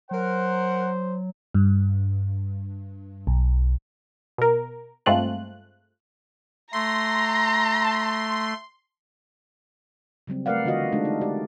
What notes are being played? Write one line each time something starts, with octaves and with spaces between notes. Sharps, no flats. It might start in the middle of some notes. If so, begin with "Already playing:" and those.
F#3 A#4 C5 F#5
G2
B1
B2 A#4
G2 G#3 A3 C4 F4 F#6
A3 A#5 C6
C#3 F#3 G3 C4
A3 A#4 B4 D5 F5 F#5
D3 E3 F4 F#4 D#5 F5
G#3 A3 D4 D#4
D#4
G#3 G4 D5